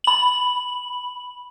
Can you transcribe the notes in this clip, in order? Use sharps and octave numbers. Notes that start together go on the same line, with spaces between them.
B5 F#7